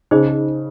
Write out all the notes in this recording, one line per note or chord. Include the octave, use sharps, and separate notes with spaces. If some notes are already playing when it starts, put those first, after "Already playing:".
C#3 D#4 G#4 C5 D#5